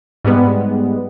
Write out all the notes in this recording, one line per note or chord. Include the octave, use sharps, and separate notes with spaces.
G#2 G3 G#3 B3